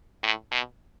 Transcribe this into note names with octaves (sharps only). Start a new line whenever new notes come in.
A2
B2